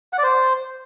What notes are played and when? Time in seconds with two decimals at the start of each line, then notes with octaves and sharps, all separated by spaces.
0.13 F#5
0.18 D5
0.23 C5